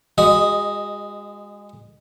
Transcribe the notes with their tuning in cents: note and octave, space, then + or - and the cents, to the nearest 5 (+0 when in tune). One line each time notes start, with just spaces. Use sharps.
G#3 -25 F#4 +0 D#5 +0